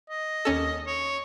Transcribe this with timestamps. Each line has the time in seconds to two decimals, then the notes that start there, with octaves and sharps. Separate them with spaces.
0.10 D#5
0.45 D#2 C#4 A4
0.87 C#5